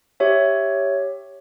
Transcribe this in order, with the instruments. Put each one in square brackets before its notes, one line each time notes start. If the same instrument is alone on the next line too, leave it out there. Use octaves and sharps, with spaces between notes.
[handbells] G4 C#5 E5